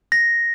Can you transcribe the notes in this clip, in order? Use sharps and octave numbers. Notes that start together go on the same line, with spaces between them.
A#6